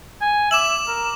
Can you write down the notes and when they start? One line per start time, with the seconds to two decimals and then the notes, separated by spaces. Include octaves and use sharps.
0.21 G#5
0.51 E5 D6 E7 F#7
0.88 A#4